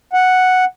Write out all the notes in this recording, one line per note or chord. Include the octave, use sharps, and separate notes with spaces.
F#5